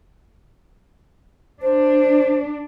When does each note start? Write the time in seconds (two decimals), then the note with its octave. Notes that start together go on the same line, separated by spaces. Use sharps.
1.62 D4 C5